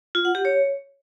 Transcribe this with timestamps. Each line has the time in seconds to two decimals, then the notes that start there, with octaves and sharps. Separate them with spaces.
0.15 F4
0.25 F#5
0.35 G4
0.45 C#5